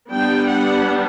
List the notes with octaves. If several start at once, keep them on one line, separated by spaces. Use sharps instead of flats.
G3 B3 D4 G5
F#5